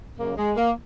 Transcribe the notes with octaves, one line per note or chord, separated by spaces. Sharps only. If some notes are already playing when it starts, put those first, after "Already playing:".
F#2 C#3 A#3
G#3
A#3